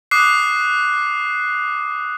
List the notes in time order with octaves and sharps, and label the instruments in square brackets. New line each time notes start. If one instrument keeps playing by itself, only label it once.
[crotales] D6 D#6 F#6 C7